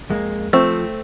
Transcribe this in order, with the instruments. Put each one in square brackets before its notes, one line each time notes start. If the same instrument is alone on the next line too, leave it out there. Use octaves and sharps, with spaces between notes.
[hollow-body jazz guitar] F2 G#3 A#3
[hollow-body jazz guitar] F3 [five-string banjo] A3 C4